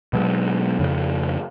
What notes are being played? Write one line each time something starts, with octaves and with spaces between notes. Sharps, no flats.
B2 F#3 G#3
F2 C#3